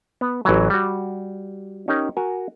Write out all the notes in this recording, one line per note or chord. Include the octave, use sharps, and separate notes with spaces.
B3
A1 E3 F#3
G3 F#4
C#4 D#4 G4 A#4 C#5
F#4 A#4 G#5